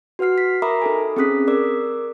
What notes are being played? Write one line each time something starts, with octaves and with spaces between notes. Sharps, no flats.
F#4 B4 F#5 F6 C7
B6
A#4 E5 A#5 B5 D6 D#6
D#4 A4 G#5
C4 C#4 G#4 D#6 F#6 B6
A#4 D5 D6 E6